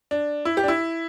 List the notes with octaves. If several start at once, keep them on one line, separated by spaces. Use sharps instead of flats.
D4
E4
G4
D4
E4